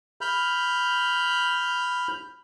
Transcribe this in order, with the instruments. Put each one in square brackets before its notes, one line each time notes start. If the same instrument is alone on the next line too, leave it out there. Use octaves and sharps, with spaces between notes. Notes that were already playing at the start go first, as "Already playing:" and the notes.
[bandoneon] B5 F6 G6